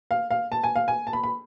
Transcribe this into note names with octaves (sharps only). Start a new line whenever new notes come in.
F5
F5
A5
G#5
F5
G#5
A5
B5
B5